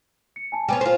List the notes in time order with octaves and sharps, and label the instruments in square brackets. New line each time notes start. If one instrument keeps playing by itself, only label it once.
[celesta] C#7
G#5 A5
[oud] G3 B3 C#4 [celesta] G5 G#5
[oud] F4 C5